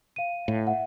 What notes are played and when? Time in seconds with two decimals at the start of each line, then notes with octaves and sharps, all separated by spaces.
0.16 F5 D#7
0.48 A2
0.67 E5 F#5